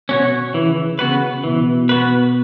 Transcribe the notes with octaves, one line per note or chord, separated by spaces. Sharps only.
B2 C#4 F#4 C#5
C#3 E3
C#3 B3 F#4 B4
B2 E3
B3 F#4 B4